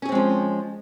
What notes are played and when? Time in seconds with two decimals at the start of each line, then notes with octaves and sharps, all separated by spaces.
0.02 C#4
0.05 G#4
0.09 C4
0.12 G#3
0.15 F3